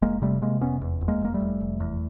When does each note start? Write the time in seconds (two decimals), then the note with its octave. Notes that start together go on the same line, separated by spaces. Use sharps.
0.02 F1 G#3 A#3
0.22 C3 G3 A3
0.42 C3 G#3 A#3
0.61 F1 B3 C#4
0.81 E2
1.01 F1
1.08 G#3 A#3
1.21 F1 A#3
1.34 G3 A3
1.40 F1
1.61 F1
1.80 E2